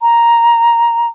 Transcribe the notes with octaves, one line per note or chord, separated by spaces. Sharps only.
A#5